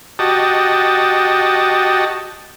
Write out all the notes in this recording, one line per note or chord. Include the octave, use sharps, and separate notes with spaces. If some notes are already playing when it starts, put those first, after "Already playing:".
F#4 G4 D#5 A5